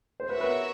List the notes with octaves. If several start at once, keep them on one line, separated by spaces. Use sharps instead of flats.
C5
F#4 A#4 B4 C#5 E5
B4